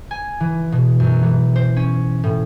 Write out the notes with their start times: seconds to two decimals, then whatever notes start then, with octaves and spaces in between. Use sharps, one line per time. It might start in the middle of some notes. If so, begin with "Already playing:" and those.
0.11 G#5
0.40 E3
0.72 B2
1.00 F#2
1.23 E3
1.56 C5
1.76 C#4
2.24 A2